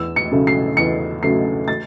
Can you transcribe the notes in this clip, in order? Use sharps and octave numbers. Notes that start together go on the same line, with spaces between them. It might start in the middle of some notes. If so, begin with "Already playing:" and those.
Already playing: E2 E6
C#7
C#3 F#3 A3
C7
E2 C#7
C#3 F#3 A3 C7
A6